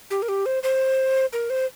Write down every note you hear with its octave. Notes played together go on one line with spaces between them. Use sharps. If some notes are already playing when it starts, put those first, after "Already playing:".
G4
A#4
G4
C5
C5
A#4
C5